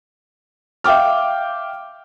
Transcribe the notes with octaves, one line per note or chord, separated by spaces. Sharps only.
E5 F5 G5 D6 F6